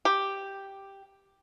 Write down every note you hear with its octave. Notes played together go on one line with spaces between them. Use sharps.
G4